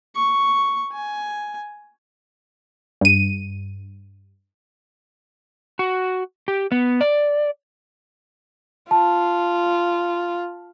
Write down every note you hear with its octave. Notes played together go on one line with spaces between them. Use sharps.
C#6
G#5
G2 D#7
F#4
G4
B3
D5
F4 A5